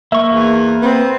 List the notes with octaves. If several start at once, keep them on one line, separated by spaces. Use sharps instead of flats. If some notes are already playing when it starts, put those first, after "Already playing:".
A#3 E5 C#6
E2
B3 C4